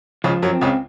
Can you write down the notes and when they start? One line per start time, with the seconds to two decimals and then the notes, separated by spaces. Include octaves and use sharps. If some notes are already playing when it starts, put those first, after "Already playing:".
0.24 C#2 C#3 F3
0.43 F#2 F#3
0.53 C4
0.61 C#2 C#3